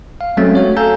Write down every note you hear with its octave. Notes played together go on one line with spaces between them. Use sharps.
F5
F#3 G#3 A3 C4 C#4
F#4 C#5
A4 F5 G#5 A#5 E6 G6